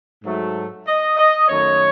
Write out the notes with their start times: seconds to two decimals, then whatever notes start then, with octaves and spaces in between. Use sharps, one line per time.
0.24 G#2 F#3 A3
0.86 D#5
1.17 D#5
1.48 F#2 D#3 A3 C#5